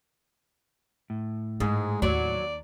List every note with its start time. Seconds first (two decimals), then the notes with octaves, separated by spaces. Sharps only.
1.10 A2
1.60 G#2 G#3 D#4
2.02 D#2 F#3 D5